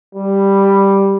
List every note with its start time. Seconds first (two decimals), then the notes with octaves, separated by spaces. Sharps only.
0.15 G3